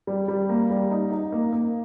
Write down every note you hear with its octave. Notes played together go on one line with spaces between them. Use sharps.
G3
G3
A#3
G3
D#4
D#4
A#3
A#3